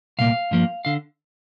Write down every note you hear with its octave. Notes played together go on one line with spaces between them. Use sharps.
C2 A#2 A#3 F5
G2 F3 A#3
D3 F5